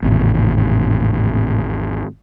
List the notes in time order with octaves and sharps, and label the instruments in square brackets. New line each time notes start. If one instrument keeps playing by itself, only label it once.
[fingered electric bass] G#1 E2 [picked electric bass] A2 C3